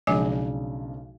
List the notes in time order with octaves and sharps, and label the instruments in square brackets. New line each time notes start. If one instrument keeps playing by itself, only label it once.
[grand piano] B1 C#3 D4 [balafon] F3 G#3 G#5